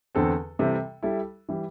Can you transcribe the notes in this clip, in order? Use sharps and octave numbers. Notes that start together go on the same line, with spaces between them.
E2 D3 C4 A4
C3 E3 G3 C4 A4
G3 E4 A4
E3 G3